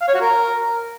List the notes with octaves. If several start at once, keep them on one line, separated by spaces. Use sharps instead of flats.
F5
C#5
F#4
A#4